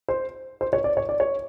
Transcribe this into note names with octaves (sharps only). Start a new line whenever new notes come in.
C5
C5
C#5
D5
C#5
D5
C#5